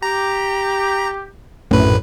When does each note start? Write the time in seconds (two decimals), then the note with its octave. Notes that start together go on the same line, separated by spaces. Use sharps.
0.03 G4 A#5
1.71 A#1 F#2 A2 B4